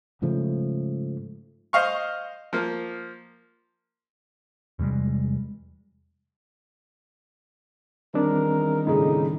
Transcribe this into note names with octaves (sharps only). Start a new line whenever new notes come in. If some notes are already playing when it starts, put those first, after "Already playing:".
G#2 C#3 F3 A3
C5 D#5 F5 C#6
F3 A#3
E2 C3 G3 G#3
E2 D#3 G3 C4 D4 A#4
D2 A2 C#3 D#4